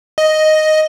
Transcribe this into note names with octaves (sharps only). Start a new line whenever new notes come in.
D#5